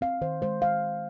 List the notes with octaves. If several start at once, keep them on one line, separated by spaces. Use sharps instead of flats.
C4 F5
D#3 C5
G#3 C5
F5